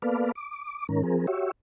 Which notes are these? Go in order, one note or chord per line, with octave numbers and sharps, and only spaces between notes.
A#3 B3 A4 B4 D5 F5
D6
G#2 D#3 C#4 A#4
F3 C4 G#4 A#4
F#4 G4 C#5 E5